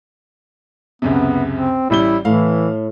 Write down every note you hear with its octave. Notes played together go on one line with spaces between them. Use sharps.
C#2 F#2 C3 B3
C4
A1 G3 E4 G7
A2 E3 F5